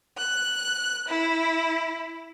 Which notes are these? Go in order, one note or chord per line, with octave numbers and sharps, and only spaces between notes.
F#6
E4